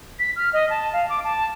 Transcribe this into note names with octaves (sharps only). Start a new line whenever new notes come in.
B6
F6
D#5
A5
F5
D6
A5